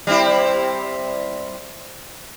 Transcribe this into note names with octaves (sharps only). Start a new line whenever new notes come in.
G3 C4 E4